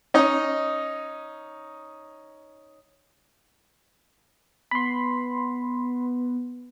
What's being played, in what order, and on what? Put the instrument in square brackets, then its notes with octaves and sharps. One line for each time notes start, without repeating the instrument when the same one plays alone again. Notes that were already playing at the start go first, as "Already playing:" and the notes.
[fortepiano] C#4 D#4 D#5
[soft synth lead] B3 [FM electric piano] B5 C6